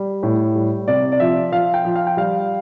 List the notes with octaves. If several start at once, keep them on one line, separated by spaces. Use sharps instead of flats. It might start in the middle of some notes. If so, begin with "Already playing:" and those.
Already playing: G3
A2
G3
C3 D5
D5
F3 E5
F3 F5
G5
F3
F5
G5
G3 F5